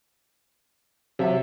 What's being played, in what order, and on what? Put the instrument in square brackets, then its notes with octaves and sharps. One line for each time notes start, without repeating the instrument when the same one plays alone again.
[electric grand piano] C3 E5 [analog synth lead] F#3